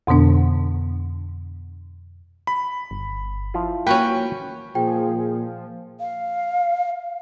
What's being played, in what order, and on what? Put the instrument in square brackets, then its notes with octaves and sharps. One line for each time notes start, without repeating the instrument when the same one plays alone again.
[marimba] F2 B2 D3 B3 D4
[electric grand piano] B5
[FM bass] G1
[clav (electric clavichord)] F3 E4 F4
[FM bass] A#3 [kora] C#4 F#4 B4 [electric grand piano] G5
[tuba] A#2 [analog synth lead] F3 [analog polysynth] G#4 [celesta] G5
[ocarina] F5